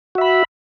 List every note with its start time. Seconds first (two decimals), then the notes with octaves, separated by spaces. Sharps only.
0.15 F#4
0.18 E5
0.21 B5